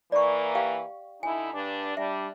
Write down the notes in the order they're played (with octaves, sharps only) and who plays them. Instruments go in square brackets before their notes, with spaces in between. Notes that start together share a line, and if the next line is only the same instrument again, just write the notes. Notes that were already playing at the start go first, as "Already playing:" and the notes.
[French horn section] E3 A#3 [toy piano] D5 C#6
[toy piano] G4 F5 G5
[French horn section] D3 D#4 E4 [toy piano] G#5
[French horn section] G2 D4
[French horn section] G3 D4 [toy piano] E5